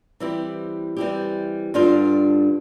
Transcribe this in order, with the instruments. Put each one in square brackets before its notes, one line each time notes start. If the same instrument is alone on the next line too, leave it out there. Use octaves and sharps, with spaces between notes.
[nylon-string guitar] E3 G3 C4 E4 G4
E3 G3 C4 E4 G4
G2 D3 G3 D4 F4